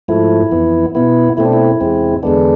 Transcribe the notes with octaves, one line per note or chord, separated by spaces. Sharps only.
G#2 F3 A3 E4
F2 E3 B3
B2 B3 E4
B2 A3 C4 E4
D4
E4
E2 C3 G#3 C4
E2 D3 G#3 B3 D4